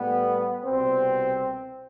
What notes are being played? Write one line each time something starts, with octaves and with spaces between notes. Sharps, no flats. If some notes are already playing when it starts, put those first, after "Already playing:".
Already playing: A2 G3 B3
C2 B2 G3 C4